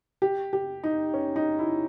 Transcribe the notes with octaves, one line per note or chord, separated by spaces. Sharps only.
G4
G4
D#4
C#4
D#4
E4